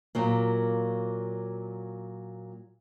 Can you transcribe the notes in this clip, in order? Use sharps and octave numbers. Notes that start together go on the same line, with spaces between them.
A#2 F#3 A#3